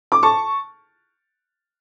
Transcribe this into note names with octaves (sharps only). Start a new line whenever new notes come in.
D6
A5 C#6